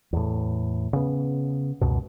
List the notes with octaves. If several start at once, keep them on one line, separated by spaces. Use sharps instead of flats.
E2 A2
C#3 B3
C#2 F#2 B2